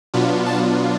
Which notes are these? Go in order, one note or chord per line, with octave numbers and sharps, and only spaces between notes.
B2 F#3 B3 D4 F4
A5